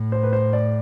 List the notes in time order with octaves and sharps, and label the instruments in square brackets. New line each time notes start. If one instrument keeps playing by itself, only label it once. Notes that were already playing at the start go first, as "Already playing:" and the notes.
Already playing: [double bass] A2
[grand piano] C5
B4
C5
D5